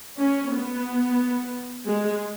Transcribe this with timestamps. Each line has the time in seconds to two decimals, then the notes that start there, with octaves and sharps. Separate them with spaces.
0.18 C#4
0.53 B3
1.88 G#3